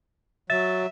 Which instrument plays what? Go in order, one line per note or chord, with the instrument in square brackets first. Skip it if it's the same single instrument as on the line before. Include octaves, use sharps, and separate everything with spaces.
[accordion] F#3 [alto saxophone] E5 [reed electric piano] A6